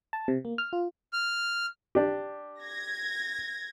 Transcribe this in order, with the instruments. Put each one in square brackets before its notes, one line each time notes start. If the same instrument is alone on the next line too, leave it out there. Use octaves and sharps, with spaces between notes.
[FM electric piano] A5
C3
A#3
F6
F4
[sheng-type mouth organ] F6
[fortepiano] D4 G4
[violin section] G#6 A#6